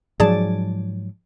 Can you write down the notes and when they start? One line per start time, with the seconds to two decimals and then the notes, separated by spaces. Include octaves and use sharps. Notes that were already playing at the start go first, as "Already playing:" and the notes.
0.20 G#2 F3 F#3 G#4 D5 A5